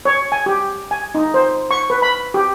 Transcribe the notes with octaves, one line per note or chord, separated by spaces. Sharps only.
C#5
G#5
G4
G#5
D#4
C5
C#6
B4
B5
G4